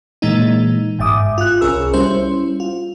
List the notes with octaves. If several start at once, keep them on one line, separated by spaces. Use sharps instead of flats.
A#2 E3 G#3 A#3 D#4
G1 G#2 E5 D6 D#6
F4 F#6
C2 C#4 G#4 A#4 E6
G3 C#4 E4 C5
F4